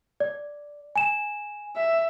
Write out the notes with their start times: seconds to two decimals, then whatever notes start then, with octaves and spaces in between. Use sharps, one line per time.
0.20 D5
0.96 G#5 E7
1.76 E5